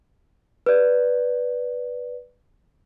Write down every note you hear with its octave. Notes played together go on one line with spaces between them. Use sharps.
B4 D5